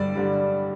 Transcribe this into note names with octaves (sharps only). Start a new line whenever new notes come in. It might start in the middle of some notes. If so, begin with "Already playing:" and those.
Already playing: G2 D3 G3 D5
D3 G3